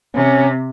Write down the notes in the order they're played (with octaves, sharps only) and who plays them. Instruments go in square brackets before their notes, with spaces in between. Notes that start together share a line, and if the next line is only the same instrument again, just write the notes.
[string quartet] C3 [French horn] C#4